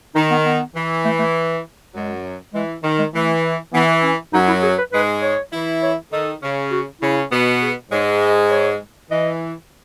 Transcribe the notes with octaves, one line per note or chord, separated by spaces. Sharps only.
D#3 D#4
B3
B3
E3
A3
A3
F#2 F#3 G#3
E3 G#3
D#3
G#3
E3 A3
E3 B3
C#4
F#2 F#3 D#4
E4
G#4
B4
G#2 G#3 B4
C#5
E3 E4
C#5
D#3 D#4 A4
C#3 C#4
F#4
C#3 C#4 E4
B2 B3
G#4
G#2 G#3 C#5
D#5
C#5
E3 D#5